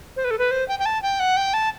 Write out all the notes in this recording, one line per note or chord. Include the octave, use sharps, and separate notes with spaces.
C5
B4
A4
B4
C5
G5
G5
A5
G5
F#5
G5
A5